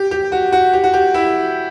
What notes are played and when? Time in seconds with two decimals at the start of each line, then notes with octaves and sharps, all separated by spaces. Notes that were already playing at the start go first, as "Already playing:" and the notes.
Already playing: G4
0.11 G4
0.32 F#4
0.52 F#4
0.73 G4
0.84 F#4
0.94 G4
1.14 E4